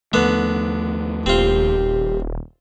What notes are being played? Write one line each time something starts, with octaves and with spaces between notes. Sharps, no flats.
D#2 D3 F3 A3 B3
D#1 C4 F4 G4